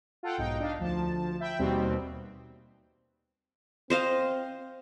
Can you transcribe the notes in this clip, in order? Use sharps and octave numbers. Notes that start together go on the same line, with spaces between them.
F4 A4 F#5 G5
B1 G#2 D#4 G5
D4 D#4 F5
D2 F3 A5
E5 G5 B5
D#2 B2 G3 C4
C4 C5 D#5 F5